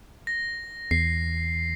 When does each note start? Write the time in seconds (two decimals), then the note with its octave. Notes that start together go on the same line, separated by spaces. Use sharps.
0.27 A#6
0.91 E2 C7